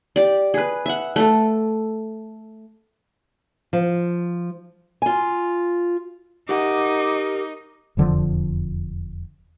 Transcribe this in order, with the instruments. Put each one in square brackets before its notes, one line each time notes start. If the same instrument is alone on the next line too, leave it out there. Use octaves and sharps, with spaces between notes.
[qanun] G4 D5
G#4 B4
E5 F#5
A3 A4
[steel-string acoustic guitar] F3
[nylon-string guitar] F4 G#5
[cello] D#4 [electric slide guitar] G4 A#4 F#5 [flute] D6
[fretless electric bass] E1 F2 D3 F3